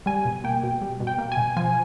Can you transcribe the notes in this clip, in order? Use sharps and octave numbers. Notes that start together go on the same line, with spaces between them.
G3 G#5
B2
A#3 G5
B2
G3
B2
G5
A#3
G#5
B2
F3 G#5